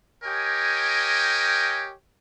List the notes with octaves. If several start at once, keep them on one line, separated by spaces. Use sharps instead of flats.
G4 A#4 C#5 D#5 G5 G#5